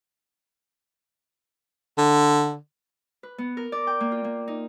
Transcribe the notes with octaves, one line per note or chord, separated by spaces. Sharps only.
D3
B4
B3
A#4
D5
G5
A#3
F4
A#3
D#4